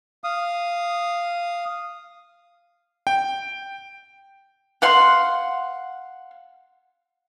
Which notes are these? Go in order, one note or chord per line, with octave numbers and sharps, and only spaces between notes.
F5 D#6
G5
F5 F#5 C6